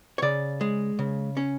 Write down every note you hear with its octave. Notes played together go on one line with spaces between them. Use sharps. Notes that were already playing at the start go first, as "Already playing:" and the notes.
C#5
C#3 D5
G#3
C#3
C#4